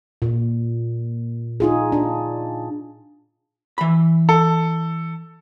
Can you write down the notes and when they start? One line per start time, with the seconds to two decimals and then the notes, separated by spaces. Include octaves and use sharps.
0.22 A#2
1.60 D#4 F4 G#4
1.92 D4
3.78 E3 B5
4.29 A4